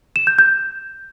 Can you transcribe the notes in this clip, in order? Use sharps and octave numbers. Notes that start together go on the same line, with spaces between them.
E7
G6
G6